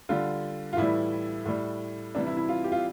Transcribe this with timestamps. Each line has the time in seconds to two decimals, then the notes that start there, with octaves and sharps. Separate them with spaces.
0.09 D3 G3 F4
0.73 F4
0.77 A2 E3 G3 E4
1.46 A2 G3
2.15 C3 E3 G3 D4
2.27 E4
2.37 E4
2.49 F4
2.64 G4
2.72 F4